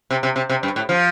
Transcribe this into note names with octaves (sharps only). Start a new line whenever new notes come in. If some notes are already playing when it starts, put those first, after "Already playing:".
C3
C3
C3
C3
G2
A2
F3